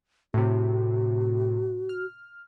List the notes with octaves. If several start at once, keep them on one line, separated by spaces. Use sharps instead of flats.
A2 C3 F#4
F6